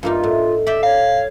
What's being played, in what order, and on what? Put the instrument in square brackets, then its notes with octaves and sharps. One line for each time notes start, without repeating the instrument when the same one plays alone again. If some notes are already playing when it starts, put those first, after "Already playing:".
[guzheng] G2 A#3 D#4 [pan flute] F4
[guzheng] A2
[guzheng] D5 G5 [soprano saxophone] E5
[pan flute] C#5 [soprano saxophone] F5